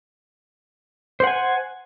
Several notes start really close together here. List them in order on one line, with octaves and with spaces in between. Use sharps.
C5 F#5 G#5